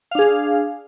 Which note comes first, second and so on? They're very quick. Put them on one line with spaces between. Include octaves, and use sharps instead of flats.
F5 D4 G#4